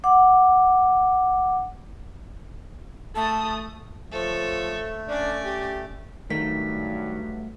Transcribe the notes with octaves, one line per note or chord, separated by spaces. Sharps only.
F#5 D6
A3 A5 D#6
F3 A3 A4 C#5
C#4 D4 D5
G4
G2 D#3 F#3 A3 B6